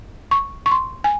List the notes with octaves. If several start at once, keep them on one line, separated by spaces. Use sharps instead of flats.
C#6
C#6
C6
G#5